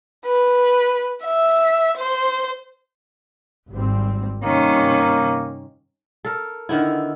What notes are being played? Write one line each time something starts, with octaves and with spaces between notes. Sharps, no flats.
B4
E5
C5
G#1 G3 C4
G2 C3 D#3 A#3 C#4
A4 A#4
D3 D#3 B3 E4